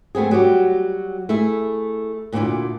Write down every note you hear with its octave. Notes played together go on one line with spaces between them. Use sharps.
A3 B3 C4 G#4
F#3 G3 F#4 G4
A3 E4 G#4 E5
D2 A#2 A#3 D4 E4 D5